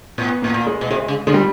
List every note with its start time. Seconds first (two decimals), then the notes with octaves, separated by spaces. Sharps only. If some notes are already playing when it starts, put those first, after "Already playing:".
0.18 A2 B3
0.42 A2 A#3
0.54 A#2
0.67 G#3
0.81 B2
0.91 C3 G#3
1.08 C#3
1.27 D3 G#3
1.34 G3